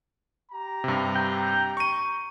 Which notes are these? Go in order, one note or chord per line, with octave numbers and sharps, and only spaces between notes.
G4 A#5
G2 C3
G5
C#6 D#7